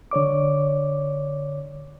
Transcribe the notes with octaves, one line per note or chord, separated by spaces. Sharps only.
D3 C#5 D5 D6